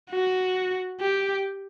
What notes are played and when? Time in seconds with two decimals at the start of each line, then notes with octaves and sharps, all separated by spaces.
0.11 F#4
1.01 G4